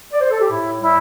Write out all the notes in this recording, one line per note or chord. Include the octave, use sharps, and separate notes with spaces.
D5
C5
A4
G4
A2 E4
G3 E4